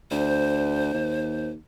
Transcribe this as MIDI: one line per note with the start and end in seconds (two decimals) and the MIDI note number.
0.11 0.94 38
0.11 1.50 72
0.94 1.55 39